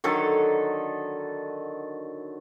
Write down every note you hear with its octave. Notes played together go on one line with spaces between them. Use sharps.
D3 D#3 F#3 A4